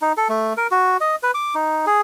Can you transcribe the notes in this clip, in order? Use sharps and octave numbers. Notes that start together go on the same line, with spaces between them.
D#4
A4
A3
A#4
F#4
D#5
B4
D6
D#4
G#4